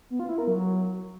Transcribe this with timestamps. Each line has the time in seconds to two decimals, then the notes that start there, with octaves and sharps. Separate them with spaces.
0.10 B3
0.20 F4
0.29 E4
0.38 A#4
0.47 F#3